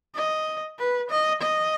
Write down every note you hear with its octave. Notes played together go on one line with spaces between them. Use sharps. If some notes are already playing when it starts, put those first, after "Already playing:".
D#5
B4
D#5
D#5